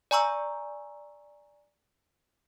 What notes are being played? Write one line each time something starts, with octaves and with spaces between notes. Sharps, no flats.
D5 G#5 A#5 C#6 E6